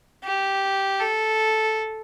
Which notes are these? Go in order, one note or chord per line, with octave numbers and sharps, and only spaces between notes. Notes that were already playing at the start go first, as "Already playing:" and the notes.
G4
A4